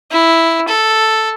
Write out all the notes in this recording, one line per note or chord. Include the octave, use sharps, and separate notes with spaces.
E4
A4